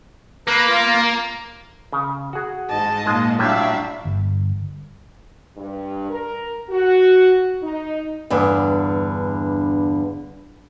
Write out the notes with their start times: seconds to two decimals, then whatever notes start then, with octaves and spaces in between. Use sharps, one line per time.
0.48 A#3 B4 A#5 B5
0.69 F4
1.93 C#3
2.33 F#4 G#4
2.69 G#2 D#5 A5
3.06 A#2 G#3 F4 G#4
3.39 A2 F#3 G3 D4 E5 F5
4.05 G1
5.57 G2
6.10 A#4
6.70 F#4
7.62 D#4
8.30 E2 G2 D3